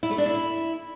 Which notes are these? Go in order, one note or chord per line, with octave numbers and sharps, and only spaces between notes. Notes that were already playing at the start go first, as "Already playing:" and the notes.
E4
A3
D4
E4